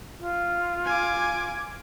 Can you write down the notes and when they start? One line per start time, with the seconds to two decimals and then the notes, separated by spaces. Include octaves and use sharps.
0.19 F4
0.85 G#5 D6